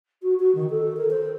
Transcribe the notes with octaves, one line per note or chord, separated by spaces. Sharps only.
F#4
F#4
D#3
A4
A#4
C5